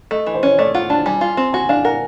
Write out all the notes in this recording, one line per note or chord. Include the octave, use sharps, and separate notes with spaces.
A3 D#5
E3
C5
C#4 C#5
A3 D5
F4 F#5
D4 A5
G3 G#5
F4
C4
F#4 G#5
D4 F5
A#4 F#5